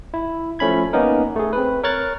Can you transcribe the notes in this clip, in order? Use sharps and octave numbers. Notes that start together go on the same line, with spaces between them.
E4
F3 A3 C#4 B5 G#6
A#3 B3 C#4 D#4 A#4
A3 G#4
C4 B4
A#4 C#5 C#6 F6 F#6 A6